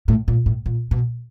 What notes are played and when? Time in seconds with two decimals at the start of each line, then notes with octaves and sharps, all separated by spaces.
0.08 A2
0.28 A#2
0.46 A2
0.66 A#2
0.91 B2